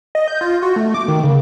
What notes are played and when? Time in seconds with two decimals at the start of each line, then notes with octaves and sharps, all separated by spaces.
0.15 D#5
0.28 G6
0.41 F4
0.62 F#4
0.76 A3
0.94 D6
1.08 D#3
1.23 C#3